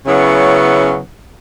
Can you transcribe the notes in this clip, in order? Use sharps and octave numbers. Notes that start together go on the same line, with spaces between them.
C#3 F#3 B3 C#4 E4